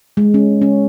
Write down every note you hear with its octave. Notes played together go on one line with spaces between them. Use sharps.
G#3
C#4
C#4